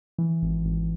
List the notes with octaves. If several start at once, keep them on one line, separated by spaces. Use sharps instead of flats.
E3
G#1
G#1